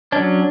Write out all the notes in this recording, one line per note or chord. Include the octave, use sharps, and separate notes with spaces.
F#3 C#4 D4